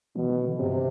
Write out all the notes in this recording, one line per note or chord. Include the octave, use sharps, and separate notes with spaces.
B2 E3
E3
D3
G2 C3